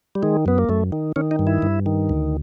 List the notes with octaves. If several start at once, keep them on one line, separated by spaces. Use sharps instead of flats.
G3
D#3 G#3
F#2 B3
A#3
F#2 A3
D#3
D#3 C#4
D#4
G2
E4
G2
D#3
D2